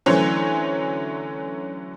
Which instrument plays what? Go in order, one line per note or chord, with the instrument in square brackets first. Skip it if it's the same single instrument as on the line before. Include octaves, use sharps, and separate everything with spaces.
[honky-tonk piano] D3 E3 F#3 A3 C#4 C5